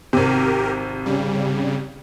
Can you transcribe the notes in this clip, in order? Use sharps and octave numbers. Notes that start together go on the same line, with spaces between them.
G#1 C3 G4 A#4
C#3 G3